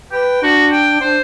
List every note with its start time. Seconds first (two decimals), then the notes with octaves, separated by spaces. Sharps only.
0.12 B4 G5
0.43 D4 F#4
0.72 G5
1.01 D4 C5